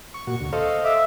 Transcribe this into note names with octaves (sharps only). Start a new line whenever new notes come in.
C#6
A#2 F#4
D2
A4 C5 D#5 F5
E5 D6